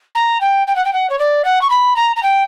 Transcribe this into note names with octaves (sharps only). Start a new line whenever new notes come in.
A#5
G5
G5
F#5
G5
F#5
C#5
D5
F#5
C#6
B5
A#5
A#5
G5